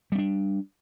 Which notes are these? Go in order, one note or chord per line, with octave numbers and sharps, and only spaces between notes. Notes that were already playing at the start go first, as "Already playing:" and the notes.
G3 C4 D4